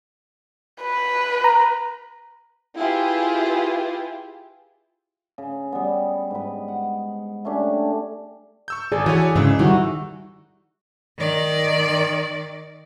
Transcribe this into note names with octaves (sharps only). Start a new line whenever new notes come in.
B4
A#5
E4 F4 G4 G#4 B4
C#3
G3 B3
G#2 B4
F#5
A3 C#4 D4 G4
C#6 E6 G6
G#1 G#4 A4 D5
E3 F#4 A4 C#5
G#2 C#3 E3 C5 E6
D#3 G3 E4 F#4
D#3 D5